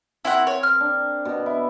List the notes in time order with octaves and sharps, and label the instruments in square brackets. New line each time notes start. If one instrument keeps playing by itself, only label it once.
[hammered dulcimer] C4 A#4 [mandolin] E4 F#4 F#5
[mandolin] C#5
F6
[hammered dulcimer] D4
B2
E4